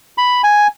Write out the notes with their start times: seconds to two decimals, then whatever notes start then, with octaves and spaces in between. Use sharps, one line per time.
0.18 B5
0.43 G#5